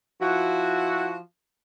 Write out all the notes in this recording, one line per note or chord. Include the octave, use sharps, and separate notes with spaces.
F3 E4 F#4